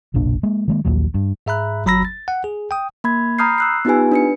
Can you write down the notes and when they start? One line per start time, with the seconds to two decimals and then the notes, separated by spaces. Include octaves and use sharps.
0.14 F#1 B1 A#2 D4
0.43 G#3 A#3
0.68 D#3 G#3 A#3
0.85 A#1 D#2 A#2 F#3
1.14 G2
1.46 G#2 G#4 E5 A#5 B5 F#6
1.86 G1 F#3 A#5 B5 E6 A#6
2.05 A6
2.28 F#5
2.44 G#4
2.71 G5 D#6
3.04 A#3 B5 G#6
3.39 A#5 B5 D#6 F6 G6 C7
3.58 E6 F#6 C7
3.85 B3 D#4 F4 G4 B4 G#5
4.12 D4 B4 C#7